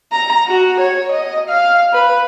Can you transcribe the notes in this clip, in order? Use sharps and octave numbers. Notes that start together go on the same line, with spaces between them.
A#5
F#4
C#5
D#5
F5
B4